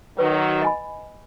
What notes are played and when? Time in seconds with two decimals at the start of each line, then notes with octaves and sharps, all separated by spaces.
0.18 D#3 F#3 B4
0.62 D#5 G#5 B5